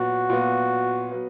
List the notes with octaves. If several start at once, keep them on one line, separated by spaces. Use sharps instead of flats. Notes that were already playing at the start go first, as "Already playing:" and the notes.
Already playing: A#2 F#3 B3 F#4
A#2 F#3 B3
F#3 B3